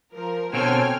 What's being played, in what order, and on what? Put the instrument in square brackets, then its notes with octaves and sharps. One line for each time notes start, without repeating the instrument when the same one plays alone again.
[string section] F3 A#4
[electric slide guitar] B2 D3 C4 [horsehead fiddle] A4 C#5 [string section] G5 G#5 F6